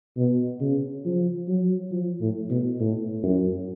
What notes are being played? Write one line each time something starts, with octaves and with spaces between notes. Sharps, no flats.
B2
C#3
F3
F#3
F3
A2
B2
A2
F#2